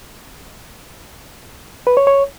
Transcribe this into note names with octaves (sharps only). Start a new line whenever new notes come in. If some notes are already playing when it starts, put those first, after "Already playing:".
B4
C#5
C#5